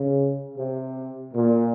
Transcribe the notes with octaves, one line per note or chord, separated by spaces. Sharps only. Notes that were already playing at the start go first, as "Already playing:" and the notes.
Already playing: C#3
C3
A#2